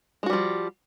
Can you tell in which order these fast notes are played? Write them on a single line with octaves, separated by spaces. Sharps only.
G#3 F#4 G3 F3